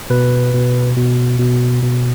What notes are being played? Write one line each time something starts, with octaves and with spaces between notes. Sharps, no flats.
B2 B4
B2
B2
B2
B2